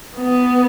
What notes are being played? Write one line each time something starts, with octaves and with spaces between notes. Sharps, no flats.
B3